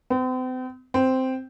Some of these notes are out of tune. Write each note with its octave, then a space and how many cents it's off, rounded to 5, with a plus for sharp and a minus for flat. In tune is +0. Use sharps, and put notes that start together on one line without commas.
C4 -40
C4 -5